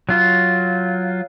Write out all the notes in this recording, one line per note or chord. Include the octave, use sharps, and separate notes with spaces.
F#3 F4